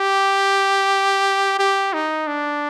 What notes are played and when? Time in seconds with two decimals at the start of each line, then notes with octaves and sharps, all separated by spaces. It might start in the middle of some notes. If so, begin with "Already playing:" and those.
Already playing: G4
1.59 G4
1.93 D#4
2.27 D4